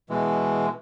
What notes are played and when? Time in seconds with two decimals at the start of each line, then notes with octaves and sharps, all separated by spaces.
0.10 B2 E3 G#3